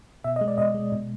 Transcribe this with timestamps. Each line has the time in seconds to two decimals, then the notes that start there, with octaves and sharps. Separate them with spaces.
0.24 B2 E5
0.36 D#5
0.41 G#3
0.48 D5
0.58 B2 D#5
0.74 G#3
0.92 B2